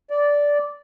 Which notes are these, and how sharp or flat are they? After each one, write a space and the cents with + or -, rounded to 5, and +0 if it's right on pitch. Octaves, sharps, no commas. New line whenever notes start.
D5 -10